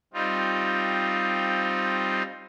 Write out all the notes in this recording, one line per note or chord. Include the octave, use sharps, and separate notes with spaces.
G3 C4 D#4 F4